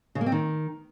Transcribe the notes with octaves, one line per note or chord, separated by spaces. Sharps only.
C#3
A#3
C4
D#3